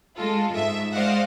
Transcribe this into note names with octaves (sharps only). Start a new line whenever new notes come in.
G#3 F4 A4
G#2 E5
G#3 C5 D5 D#5 F5 F#5